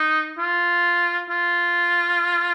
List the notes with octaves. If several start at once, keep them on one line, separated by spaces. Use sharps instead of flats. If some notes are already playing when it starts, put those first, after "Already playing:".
Already playing: D#4
F4
F4